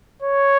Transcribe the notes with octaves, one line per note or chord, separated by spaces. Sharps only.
C#5